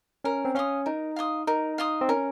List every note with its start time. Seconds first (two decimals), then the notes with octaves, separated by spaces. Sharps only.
0.24 C#4 A#4
0.45 C4
0.55 C#4 F5 C6 D#6
0.86 D#4 A#4
1.16 F5 C6 D#6
1.47 D#4 A#4
1.78 F5 C6 D#6
2.01 C4
2.09 C#4 A#4